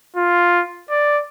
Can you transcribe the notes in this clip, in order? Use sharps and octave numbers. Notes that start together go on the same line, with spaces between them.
F4
D5